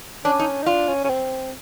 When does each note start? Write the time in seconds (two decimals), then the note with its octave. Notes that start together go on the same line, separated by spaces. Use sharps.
0.25 C#4 D4
0.39 D#4
0.63 D#4
0.66 D4 F4
0.88 C#4
1.04 C#4
1.09 C4